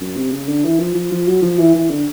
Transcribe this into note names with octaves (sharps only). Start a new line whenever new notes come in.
F#2
C3
C#3
D3
E3
F3
F3
F3
F#3
F3
E3
E3
D3